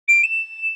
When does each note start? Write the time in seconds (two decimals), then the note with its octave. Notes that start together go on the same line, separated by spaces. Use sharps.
0.08 D7
0.23 E7